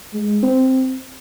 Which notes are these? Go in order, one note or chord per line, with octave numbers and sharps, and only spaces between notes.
G#3
C4